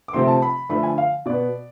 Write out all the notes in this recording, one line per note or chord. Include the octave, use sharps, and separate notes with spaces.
D6
C3 F3 A3 C4 C6
A5
B5
D3 F3 A3 B5
G#5
F5
B2 B3 D5